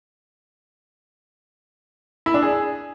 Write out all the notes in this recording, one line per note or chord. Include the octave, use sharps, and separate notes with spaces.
E4
D4
G#4